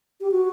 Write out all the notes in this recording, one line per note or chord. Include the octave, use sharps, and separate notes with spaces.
G4
F#4